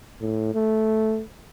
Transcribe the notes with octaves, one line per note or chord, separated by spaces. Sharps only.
A2
A3